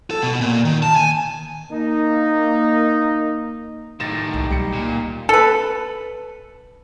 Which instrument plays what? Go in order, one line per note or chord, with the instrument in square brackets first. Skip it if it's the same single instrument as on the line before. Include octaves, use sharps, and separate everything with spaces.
[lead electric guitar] A4
B2
A#2
D#3
A5
G#5
[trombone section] A#3 D#4
[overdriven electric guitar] A2 D#3 [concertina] D#4 G4 C6 [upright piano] A6 A#6 E7
[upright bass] C2 C3
[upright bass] B1 [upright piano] G3 C#7
[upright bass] C#2 [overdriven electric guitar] A#2
[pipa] A4 B4